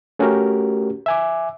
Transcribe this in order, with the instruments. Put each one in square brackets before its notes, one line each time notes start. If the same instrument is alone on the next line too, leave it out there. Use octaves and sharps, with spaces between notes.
[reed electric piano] A3 C#4 F#4 G4 A#4
E5 G#5 D6